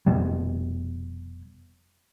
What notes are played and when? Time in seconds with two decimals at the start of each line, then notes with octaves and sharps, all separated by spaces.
0.06 F1 B2 G3